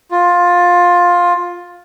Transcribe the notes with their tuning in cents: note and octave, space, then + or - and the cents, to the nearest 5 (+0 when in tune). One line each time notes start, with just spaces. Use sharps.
F4 +15